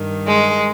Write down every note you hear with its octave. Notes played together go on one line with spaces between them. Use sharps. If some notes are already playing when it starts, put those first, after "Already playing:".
Already playing: G2 D#3
G#3